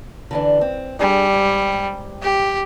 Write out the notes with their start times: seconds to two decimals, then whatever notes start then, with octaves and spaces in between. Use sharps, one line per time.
0.31 D3 E3 D4
0.61 C4
1.00 G3 D4 G#4
1.34 G#2
2.23 G4